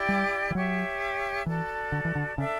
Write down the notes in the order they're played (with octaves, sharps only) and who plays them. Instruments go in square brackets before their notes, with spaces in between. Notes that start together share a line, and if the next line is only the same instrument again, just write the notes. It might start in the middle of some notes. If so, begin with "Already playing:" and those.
Already playing: [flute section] E4 G4 D5 G5
[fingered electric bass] G3
E3
[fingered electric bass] F#3 [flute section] G4 C#5 E5
[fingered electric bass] E3 [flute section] F#4 A4 D5 A5
[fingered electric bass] D3
E3
D3
[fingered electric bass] C#3 [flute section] D4 A4 E5